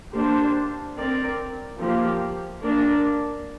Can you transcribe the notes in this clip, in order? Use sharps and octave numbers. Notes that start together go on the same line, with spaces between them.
A#3 D4 G4 C5
C4 A#4 D5
F3 A#3 G4
A#3 D4 A#4 D5